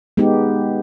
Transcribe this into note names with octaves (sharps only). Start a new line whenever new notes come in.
G#3 B3 D#4 G4